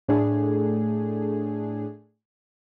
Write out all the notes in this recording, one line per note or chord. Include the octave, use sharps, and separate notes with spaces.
A2 A3 D4 G#4